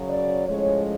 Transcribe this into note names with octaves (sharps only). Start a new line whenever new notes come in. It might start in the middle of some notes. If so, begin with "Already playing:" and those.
Already playing: F#2 C#3 F#3
D5
A2 F3 G#3 C#4 C#5